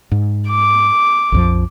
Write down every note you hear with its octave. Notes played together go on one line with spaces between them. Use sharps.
G#2
D6
A#1 F2 F3